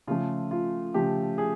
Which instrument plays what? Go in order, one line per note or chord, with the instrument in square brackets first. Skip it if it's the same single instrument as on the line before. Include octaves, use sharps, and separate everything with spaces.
[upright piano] C#3 F3 A3 F4
F4
C#3 F3 A3 G4
G#4